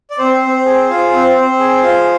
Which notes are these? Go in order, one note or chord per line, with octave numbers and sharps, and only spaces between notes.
D5
C4 C5
C4
G#4
F4
C4
C4
G#4
F4